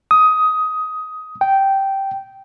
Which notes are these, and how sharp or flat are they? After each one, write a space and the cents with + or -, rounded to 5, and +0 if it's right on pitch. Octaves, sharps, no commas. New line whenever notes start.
D#6 +15
G5 -10